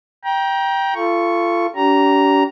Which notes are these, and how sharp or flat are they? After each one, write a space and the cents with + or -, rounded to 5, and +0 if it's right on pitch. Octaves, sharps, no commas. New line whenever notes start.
G5 +0 A#5 +30
F4 -30 A4 +0 C#6 +0
D4 -45 G4 -35 A#5 +0